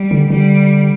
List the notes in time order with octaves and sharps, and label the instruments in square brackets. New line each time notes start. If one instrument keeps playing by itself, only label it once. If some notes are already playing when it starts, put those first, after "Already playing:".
Already playing: [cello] G3
[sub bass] D3
[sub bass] D3 [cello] G3